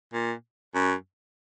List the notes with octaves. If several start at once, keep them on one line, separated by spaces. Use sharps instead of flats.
A#2
F#2